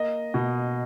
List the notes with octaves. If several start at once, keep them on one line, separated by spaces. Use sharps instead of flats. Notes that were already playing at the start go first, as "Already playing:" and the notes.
Already playing: A#3 D#5
B2